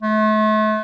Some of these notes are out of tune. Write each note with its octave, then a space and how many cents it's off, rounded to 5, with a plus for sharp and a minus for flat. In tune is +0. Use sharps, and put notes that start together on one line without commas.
A3 -35